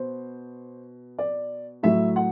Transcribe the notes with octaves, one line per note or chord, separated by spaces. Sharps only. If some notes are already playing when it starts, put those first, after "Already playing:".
Already playing: B2 C5
D5
A2 F#3 E5
F#5